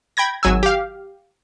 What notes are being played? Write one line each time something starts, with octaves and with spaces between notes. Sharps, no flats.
G5 B5 G#6 A#6
G#1 F#3 G#5 E6
G4 F5